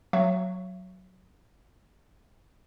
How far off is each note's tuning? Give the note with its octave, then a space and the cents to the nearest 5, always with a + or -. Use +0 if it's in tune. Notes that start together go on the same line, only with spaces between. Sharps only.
F#3 +0 E5 +40 C#6 +0